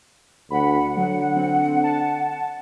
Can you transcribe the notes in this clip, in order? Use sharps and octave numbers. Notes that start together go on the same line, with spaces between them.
D2 F#5 B5
D3 F#3
C4
A5